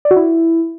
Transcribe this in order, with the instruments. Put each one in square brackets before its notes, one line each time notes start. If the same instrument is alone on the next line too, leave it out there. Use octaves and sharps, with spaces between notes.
[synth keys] D5
F#4
E4